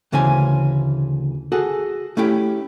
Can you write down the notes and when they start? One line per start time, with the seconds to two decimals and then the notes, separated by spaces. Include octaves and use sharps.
0.12 D2 C#3 E3 C#4 C5 G#5
1.52 F#4 G#4 A4
2.17 A3 C#4 E4 G4